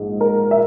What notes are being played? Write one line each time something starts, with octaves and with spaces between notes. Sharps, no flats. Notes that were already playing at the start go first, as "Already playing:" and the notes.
Already playing: A#1 G#2 F3 G#3
A#4
E5